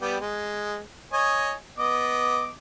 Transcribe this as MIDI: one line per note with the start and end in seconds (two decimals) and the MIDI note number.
0.01 0.17 55
0.01 0.17 59
0.01 0.17 67
0.20 0.80 56
1.13 1.53 73
1.13 1.53 75
1.13 1.53 80
1.78 2.50 59
1.78 2.50 75
1.78 2.50 86